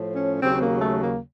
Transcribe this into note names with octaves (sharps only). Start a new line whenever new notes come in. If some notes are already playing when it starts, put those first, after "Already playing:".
Already playing: A2 F3
C#4
D#2 C#3 F#3 C4
A#3
A3
A#3